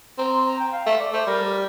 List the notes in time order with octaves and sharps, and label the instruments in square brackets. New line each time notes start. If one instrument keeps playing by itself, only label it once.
[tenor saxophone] C4 [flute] A#5
[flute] C6
A#5
G5
F5
[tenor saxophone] A3 [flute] E5
[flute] D5
[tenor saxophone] A3 [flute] C5
[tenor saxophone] G3 [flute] A#4
[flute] G4